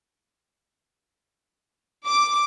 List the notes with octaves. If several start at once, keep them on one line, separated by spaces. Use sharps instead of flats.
D6